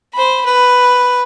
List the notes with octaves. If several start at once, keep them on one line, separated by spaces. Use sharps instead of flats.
C5 B5
B4